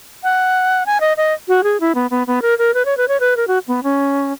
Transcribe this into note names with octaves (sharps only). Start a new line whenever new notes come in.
F#5
G#5
D#5
D#5
F#4
G#4
E4
B3
B3
B3
A#4
A#4
B4
C#5
B4
C#5
B4
A#4
F#4
B3
C#4